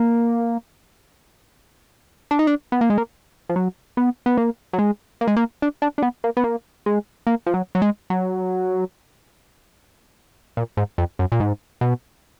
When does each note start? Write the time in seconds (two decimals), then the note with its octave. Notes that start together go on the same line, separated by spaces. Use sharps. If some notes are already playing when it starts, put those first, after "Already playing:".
Already playing: A#3
2.31 D4
2.39 D#4
2.47 D4
2.72 B3
2.81 A#3
2.90 G#3
2.98 A#3
3.49 F3
3.56 F#3
3.97 B3
4.26 B3
4.37 A#3
4.73 F#3
4.79 G#3
5.21 A#3
5.28 G#3
5.36 A#3
5.62 D4
5.82 D4
5.98 D4
6.02 B3
6.24 A#3
6.37 B3
6.44 A#3
6.86 G#3
7.27 A#3
7.46 F3
7.54 F#3
7.75 F#3
7.82 G#3
8.10 F#3
10.57 A#2
10.77 G#2
10.98 F2
11.19 F#2
11.32 A#2
11.40 G#2
11.81 B2